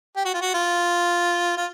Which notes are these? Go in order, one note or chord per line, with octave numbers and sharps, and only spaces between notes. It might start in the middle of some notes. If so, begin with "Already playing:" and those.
G4
F#4
F4
F#4
F4
F4